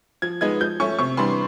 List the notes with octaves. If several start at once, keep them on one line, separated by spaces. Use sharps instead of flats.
F3 G#6
G#3 B3 D#4 G#6
F3 G6
A3 C#4 C#6
C3 C#6
E3 G3 B3 D4 C6